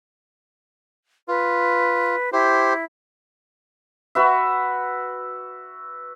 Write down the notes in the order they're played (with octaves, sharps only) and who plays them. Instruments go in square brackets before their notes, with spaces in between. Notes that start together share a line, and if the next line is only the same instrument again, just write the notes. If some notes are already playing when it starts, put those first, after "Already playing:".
[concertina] F4 [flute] B4
[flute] E4 [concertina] G4 C5
[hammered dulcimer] F#4 B4 E5